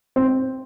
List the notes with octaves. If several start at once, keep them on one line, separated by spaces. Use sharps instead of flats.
C4